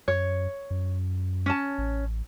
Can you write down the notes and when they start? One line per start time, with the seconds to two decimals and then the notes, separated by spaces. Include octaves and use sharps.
0.08 F#2 C#5
0.71 F#2
1.46 C#4 A5
1.78 A1